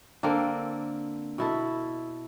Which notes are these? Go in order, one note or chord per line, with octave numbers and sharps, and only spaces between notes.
D3 A#3 C4 A4
B2 E4 A4